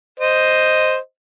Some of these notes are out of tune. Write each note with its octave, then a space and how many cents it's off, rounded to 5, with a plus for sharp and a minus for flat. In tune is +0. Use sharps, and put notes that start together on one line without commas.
C5 +0 D#5 +0